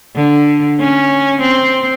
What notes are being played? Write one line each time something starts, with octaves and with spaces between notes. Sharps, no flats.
D3
C#4
C4